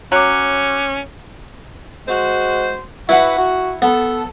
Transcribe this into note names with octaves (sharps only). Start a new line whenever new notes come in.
F#3 C#4 D6 F#6
G#3 F#4 C5
E4 F#4 B4 E5 F#5
F#4
B3 A4